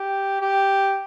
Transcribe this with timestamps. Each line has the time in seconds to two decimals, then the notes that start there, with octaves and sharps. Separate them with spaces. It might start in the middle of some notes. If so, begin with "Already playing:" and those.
Already playing: G4
0.41 G4